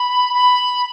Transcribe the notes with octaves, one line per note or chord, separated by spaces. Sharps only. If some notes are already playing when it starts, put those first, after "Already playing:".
Already playing: B5
B5